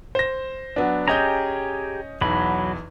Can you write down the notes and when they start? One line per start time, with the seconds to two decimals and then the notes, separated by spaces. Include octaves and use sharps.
0.15 C5 A#6
0.76 F#3 B3 D4
1.08 C#4 G4 G#4 D#5 A#5 G6
2.21 B1 E2 F#3 B5